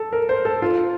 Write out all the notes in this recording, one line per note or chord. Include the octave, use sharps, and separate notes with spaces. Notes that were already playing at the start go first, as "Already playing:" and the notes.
Already playing: A4
A#4
C5
A4
F4